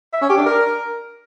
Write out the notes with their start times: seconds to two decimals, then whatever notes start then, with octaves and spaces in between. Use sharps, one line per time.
0.13 E5
0.21 C#4
0.29 G4
0.38 D4
0.46 A#4